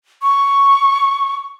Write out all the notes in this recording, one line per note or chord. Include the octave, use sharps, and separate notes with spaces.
C#6